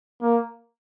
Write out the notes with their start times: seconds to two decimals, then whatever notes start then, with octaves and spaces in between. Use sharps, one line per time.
0.22 A#3